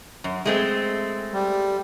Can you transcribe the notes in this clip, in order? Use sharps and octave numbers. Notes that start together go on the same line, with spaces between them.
F#2
G#3 A3 C4
G3